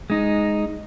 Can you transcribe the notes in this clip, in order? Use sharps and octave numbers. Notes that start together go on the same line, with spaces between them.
G#3 D#4